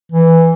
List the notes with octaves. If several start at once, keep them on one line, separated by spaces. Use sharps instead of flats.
E3